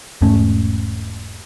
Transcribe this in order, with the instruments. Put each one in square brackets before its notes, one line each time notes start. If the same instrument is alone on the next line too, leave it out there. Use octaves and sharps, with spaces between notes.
[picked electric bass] E1 G#2 A3 C#4